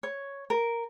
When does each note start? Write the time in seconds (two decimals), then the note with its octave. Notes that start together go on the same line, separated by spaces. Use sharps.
0.03 C#5
0.50 A#4